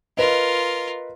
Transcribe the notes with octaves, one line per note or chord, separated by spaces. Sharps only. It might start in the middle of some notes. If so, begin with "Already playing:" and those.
F4 A#4 B4 D#5